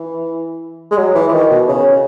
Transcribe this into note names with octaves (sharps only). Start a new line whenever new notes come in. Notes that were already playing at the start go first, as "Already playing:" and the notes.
Already playing: E3
G#3
F#3
E3
E3
D#3
B2
C#3
C#3